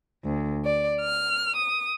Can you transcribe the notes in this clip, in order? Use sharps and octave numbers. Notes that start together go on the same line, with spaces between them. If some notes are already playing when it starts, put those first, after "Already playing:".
D2
D5
F6
D#6